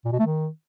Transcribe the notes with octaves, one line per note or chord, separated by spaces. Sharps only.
A#2
B2
A3
D#3